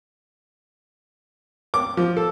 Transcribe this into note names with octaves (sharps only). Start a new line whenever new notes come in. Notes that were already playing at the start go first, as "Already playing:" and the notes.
D6
F3
A4